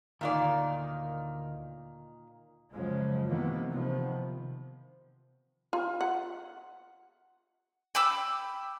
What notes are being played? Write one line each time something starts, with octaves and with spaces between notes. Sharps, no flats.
D2 A#2 D#3 D#4 D5 F5 G#5
F#2 C#3 F3 G#3
C3 D#3 E3 A#3 B3
C3 D#3 F3 B3
F4
F#5
G5 B5 D6 E6